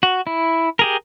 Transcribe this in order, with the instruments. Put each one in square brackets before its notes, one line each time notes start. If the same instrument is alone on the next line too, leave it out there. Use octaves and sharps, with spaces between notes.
[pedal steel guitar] F#4
E4
G4 G#4 A#4